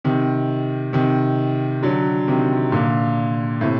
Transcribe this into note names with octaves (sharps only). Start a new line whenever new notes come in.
C3 D#3
C3 D#3
D3 F#3
C3 D#3
A#2 D3
A2 C3